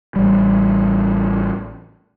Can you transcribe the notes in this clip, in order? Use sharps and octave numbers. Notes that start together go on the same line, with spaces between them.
A1 G3